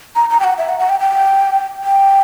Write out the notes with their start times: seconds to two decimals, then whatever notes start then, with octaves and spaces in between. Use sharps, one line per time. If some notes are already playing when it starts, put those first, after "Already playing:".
0.16 A#5
0.30 A#5
0.40 G5
0.44 F#5
0.58 E5
0.69 F#5
0.79 F#5
0.89 G5
1.00 G5
1.84 G5